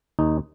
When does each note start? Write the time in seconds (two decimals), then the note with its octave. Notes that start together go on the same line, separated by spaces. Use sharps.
0.19 D#2 D#4